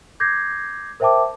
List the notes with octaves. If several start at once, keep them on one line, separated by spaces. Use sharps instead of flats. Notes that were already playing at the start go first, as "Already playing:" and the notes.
D6 G6 G#6 A#6 C7
A#4 C5 E5 G5 A5 D6